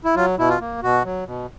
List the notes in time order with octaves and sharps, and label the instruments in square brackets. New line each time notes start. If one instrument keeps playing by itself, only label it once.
[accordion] E4
F#3 F4
B2 E4
F4
A#3
B2 F#4
F#3
B2